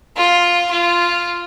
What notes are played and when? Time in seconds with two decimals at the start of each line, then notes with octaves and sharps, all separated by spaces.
0.17 F4
0.71 F4